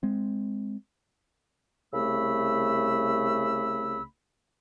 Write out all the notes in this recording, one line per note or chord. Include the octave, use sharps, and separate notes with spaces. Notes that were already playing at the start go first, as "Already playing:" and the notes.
G#3 C4
C2 C#3 A3 B5 E6